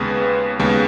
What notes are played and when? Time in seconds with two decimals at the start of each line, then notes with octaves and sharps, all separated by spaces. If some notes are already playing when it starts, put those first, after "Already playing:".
Already playing: D#2 C#3 G#3 B3 G#4 B4
0.60 D#2 C#3 G#3 B3